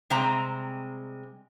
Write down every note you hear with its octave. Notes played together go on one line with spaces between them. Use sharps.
C3 G3 G#3 C4 A#5